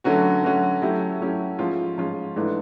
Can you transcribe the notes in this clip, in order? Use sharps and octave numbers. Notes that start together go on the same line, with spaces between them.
D3 F#3 A3 C#4 F#4
D3 F#3 A3 C#4 F#4
F#3 A3 C#4 E4 G4
F#3 A3 C#4 E4 G4
G#2 F3 G#3 C#4 F4
G#2 F3 G#3 C#4 F4
G#2 E3 A3 D4